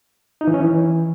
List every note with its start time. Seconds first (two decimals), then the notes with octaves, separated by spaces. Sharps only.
0.41 D#4
0.47 E3
0.54 C#4
0.60 E3